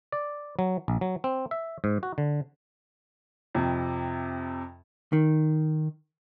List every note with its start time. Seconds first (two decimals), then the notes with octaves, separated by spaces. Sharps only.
0.12 D5
0.59 F#3
0.88 A#1
1.01 F#3
1.24 C4
1.51 E5
1.84 G#2
2.03 F#4
2.18 D3
3.55 F2 C3
5.13 D#3